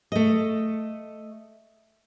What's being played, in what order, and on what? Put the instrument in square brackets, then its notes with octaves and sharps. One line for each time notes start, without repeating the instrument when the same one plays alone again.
[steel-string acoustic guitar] A3 D#5